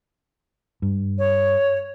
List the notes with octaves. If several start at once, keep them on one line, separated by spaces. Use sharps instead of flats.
G2
C#5